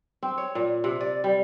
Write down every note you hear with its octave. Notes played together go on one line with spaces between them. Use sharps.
C4
C#5
A#2
C3
D5
G3